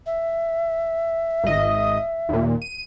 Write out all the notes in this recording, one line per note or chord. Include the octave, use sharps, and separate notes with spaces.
E5
G#1 D#5
D#2 A#2
D#7